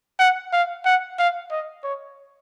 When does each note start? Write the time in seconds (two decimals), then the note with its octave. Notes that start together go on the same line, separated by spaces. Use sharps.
0.19 F#5
0.53 F5
0.85 F#5
1.18 F5
1.51 D#5
1.83 C#5